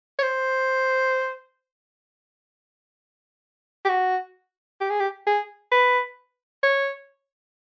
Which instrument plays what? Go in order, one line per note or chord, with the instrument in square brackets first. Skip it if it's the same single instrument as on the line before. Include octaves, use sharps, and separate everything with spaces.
[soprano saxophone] C#5
C5
G4
F#4
G4
G#4
G4
G#4
B4
C#5